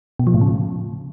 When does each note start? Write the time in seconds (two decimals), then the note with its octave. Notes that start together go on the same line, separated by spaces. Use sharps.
0.19 B2
0.27 F3
0.34 A2
0.41 C#3